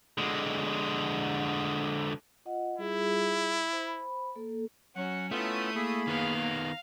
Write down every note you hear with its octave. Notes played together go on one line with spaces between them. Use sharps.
D3 G#3
F4 D#5 F#5
G3 E4 F4 G#4
C5 B5
A#3 A4
F#3 C#4 F#4 F#5
A3 B3 C#4 E4 F4 D#6 B6
A#3 G#4 B5
D#3 B3 F5
A#5